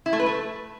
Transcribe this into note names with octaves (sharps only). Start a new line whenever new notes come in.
E4
A3
B4
A3